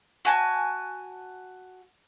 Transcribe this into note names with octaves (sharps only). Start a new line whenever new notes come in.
F#4 G#5 A5